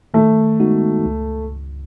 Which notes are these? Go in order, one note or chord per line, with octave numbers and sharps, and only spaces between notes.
D#3 A3
G#3 B3 D#4 F#4
C#2